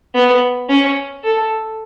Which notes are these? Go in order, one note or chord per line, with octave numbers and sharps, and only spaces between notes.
B3
C#4
A4